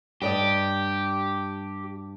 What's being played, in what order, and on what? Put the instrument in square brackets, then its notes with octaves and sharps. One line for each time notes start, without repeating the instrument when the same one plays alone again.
[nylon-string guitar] G2 D5 D#5 [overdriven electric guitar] G4